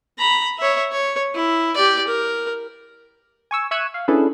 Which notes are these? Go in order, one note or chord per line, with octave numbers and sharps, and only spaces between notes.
A#5 B5
C#5 E5
C#5
E4
G4 D5
A#4
G#5 C#6 E6
E5 C#6 E6 F#6 G#6 D#7
F5
C#4 D4 E4 G#4 A4 B4